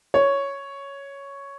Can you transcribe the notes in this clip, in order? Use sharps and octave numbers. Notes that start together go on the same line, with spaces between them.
C#5